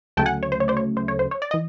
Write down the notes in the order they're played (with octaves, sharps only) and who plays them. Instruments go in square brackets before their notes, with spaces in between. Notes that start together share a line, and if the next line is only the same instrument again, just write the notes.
[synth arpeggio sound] D2 C#3 F#3 A3 G5 A5
F#5 G#5
C#5
C5
C#5
C5 D5
C#5
C5
C#5
C5
C#5
D5
E3 D#5